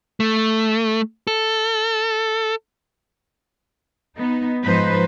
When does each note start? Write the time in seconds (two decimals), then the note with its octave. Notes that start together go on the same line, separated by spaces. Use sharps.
0.20 A3
1.27 A4
4.17 B3 D#4
4.64 G#2 F3 D#4 B4 C5